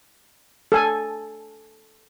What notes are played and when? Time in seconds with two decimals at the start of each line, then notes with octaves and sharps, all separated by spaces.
0.72 A4 G#5